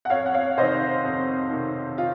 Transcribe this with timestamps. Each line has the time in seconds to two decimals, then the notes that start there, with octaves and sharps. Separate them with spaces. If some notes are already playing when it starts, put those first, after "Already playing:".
0.05 F#5
0.10 F2 C#5 F5
0.26 F#5
0.34 C#5 F5
0.57 C3 C5 D#5
0.61 D#3
1.04 F2
1.50 C3 D#3
1.98 F4